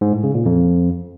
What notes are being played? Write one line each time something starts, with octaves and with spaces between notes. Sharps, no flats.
G#2
A2
C#3
A#2
F2